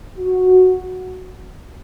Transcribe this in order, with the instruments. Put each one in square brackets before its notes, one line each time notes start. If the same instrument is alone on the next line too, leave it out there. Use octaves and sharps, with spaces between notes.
[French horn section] F#4